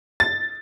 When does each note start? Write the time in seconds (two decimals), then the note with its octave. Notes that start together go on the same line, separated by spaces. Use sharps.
0.20 A6